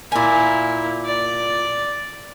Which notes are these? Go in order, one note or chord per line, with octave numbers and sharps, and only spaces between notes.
A#2 A#3 E4 G#5
D5